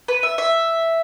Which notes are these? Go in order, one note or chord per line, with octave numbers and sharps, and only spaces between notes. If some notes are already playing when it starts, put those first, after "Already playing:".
B4
E5
E5